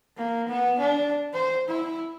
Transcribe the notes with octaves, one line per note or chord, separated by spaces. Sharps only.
A#3
B3
D4
C5
E4